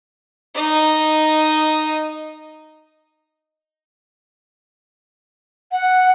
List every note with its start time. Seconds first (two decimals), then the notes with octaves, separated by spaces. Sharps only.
0.54 D#4 D#5
5.72 F#5